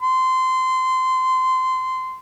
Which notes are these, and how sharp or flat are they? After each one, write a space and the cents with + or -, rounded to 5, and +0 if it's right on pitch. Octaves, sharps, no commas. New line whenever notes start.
C6 -20